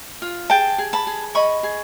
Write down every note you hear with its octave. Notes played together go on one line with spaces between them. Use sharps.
F4
G#4 G5 A5
G#4
A5 B5
G#4
D#5 B5 C#6
G#4